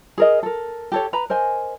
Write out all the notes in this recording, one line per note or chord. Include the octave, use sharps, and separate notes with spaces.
G#4 A#4 D#5
A4 A#4
G4 A4 C#5
B4 A#5 B5
A#4 C5 D#5 G#5